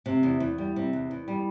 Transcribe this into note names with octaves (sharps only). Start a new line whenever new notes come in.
C3
E2
E2
G3
C3
E2
E2
G3